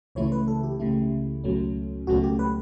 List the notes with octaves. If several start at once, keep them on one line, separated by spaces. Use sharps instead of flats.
C#2 C#3 E3 A3 E4 C#5
B4
A4
G4
C#2 C#3 E3 A3 E4
C#2 B2 F#3 A3 C#4
C#2 B2 F#3 A3 C#4 F#4
G4
B4